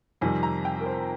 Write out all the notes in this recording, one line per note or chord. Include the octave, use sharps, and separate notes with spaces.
F2 C3 D#3 G3 G#5
A#5
G5
A#4
C5